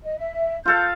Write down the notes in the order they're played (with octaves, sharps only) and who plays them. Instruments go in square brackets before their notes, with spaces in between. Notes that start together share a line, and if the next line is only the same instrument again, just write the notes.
[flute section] D#5
E5
[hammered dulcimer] F4 A4 F5 [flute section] G6